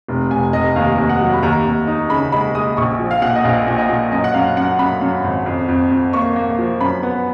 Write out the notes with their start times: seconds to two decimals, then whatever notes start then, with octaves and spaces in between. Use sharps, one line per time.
0.08 F1
0.30 F1 G#5
0.53 F1 D#5
0.76 D#2 F5
0.98 D#2
1.09 F#5
1.20 F#3
1.34 B5
1.43 D#2 A#5
1.65 D#2
1.87 D#4
2.10 C#3 B5
2.32 G#3 B5
2.55 G#3 D#6
2.77 A#1 C#6
2.99 F3
3.11 F5
3.22 A#2 F#5
3.35 D#5
3.44 A#1 F5
3.67 A#2
3.78 D#5
3.89 A#2
4.12 F#2 D#5
4.24 F#5
4.34 F#2 F5
4.57 F#2 F#5
4.79 F#2 B5
5.01 F#2
5.24 G#1
5.46 F2
5.68 F2
5.91 F2
6.13 A#3 C#6
6.36 A#3
6.59 F3
6.81 F#2 B5
7.03 B3